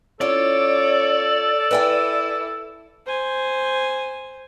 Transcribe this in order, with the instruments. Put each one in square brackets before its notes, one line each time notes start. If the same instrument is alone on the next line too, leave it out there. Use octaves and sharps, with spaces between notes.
[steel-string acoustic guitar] C#4 F4 [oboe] A4 [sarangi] C#5 [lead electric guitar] D5
[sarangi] E4 [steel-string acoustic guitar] B4 G5 G#5
[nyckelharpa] C5 G#5